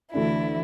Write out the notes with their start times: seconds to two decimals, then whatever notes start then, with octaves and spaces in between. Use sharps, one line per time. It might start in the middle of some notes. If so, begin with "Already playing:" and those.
0.13 D2 D3 E3 A3 D4 E4